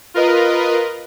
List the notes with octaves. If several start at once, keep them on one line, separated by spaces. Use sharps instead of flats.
F4 A#4 B4 D#5